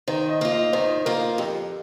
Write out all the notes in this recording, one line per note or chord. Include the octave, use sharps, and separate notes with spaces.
D#3 C5
D#5
A#3 F4
D#5
D#3 C5
A#3 F4 A#4
F2 G4